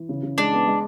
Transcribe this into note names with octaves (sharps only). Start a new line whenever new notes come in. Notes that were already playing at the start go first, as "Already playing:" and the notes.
Already playing: E3
C#3
C#3
G#3 D4
B3
G#3